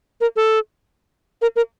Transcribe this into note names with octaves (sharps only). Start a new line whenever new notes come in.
A#4
A4
A#4
A#4